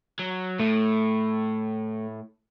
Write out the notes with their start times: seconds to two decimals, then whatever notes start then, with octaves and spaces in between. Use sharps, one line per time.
0.19 F#3
0.60 A2 A3